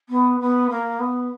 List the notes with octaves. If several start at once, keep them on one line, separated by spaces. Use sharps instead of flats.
B3
B3
A#3
B3